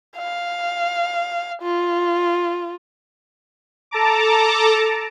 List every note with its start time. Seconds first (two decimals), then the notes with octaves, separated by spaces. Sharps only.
0.17 F5
1.62 F4
3.91 A4 A5 A#5 D6